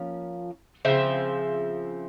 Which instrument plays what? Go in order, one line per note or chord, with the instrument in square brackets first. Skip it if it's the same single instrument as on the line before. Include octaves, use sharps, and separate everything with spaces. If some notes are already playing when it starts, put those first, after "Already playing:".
Already playing: [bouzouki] F3 A#3 C#4
C#3 F3 C4 C5 E5